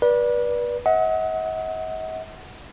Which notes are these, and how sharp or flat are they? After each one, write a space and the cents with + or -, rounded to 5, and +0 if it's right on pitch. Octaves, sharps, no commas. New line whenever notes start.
B4 -30 D5 +0
D#5 +45 F#5 +0